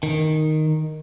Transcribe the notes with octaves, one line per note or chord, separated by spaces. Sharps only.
D#3